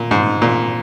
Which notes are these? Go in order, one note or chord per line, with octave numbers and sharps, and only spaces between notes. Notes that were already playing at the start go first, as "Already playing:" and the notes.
Already playing: A#2
G#2
A#2